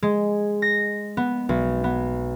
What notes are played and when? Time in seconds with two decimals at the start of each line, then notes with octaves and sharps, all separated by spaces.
0.03 G#3
0.62 A#6
1.17 B3
1.49 B1
1.84 B3